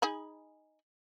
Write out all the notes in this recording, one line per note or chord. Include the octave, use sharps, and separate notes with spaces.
D#4 G#4 B5